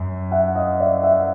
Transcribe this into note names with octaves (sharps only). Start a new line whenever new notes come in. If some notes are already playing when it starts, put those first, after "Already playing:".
Already playing: F#2
E5 F#5
D#5 F5
D5 E5
E5 F#5